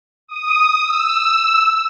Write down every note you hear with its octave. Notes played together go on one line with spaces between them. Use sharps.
D#6
E6